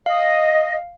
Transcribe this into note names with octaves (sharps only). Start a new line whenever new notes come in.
D#5 F5